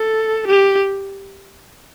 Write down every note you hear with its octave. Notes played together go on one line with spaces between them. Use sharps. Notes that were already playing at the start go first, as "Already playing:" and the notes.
Already playing: A4
G4